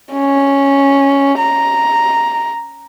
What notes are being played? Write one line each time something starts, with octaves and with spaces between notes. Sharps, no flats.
C#4
A#5